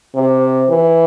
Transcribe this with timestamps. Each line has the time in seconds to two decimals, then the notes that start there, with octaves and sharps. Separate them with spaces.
0.15 C3
0.69 E3